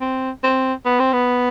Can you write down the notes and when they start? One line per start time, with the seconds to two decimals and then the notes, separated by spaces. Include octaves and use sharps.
0.01 C4
0.44 C4
0.85 B3
1.00 C4
1.13 B3